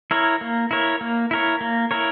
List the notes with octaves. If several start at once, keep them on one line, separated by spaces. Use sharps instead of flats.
E4 A#4 C#5
A#3
E4 A#4 C#5
A#3
E4 A#4 C#5
A#3
E4 A#4 C#5